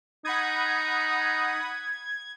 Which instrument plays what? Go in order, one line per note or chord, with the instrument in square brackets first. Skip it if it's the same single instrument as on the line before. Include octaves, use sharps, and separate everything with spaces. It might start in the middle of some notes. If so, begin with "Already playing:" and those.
[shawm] D#4 [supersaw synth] F#5 B5 D#6 [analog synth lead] G#6